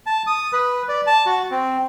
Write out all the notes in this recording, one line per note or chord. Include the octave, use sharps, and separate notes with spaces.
A5
D#6
B4
D5
A5
F#4
C4